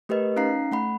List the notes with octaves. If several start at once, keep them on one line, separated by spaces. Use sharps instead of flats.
A3 G4 A#4 B4 D#5
C#4 D#4 F5 A#5 C7
A3 F#5 B5